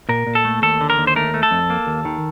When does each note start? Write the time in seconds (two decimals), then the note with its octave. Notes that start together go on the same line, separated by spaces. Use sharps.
0.09 A#2 A#4
0.27 A#2
0.35 A4
0.45 A3
0.62 D#2 A4
0.81 D3
0.90 A#4
0.98 D#2
1.07 C5
1.16 A3 A#4
1.34 A3
1.43 A4
1.51 F2
1.70 A#3
1.87 D#2
2.05 D#3